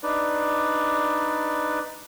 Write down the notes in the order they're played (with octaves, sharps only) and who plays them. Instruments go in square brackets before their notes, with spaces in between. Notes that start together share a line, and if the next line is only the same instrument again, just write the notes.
[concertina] D4 D#4 B4 D5